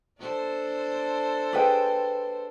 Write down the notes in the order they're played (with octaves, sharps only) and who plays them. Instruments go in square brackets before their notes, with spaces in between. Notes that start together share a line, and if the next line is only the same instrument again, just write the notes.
[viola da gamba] D4 A4 C5
[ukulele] G#4 B4 G5